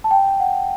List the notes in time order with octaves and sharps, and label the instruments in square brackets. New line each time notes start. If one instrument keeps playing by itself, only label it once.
[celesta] A5
G5
F#5